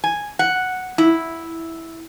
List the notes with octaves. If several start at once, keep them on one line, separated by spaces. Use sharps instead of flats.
G#5
F#5
E4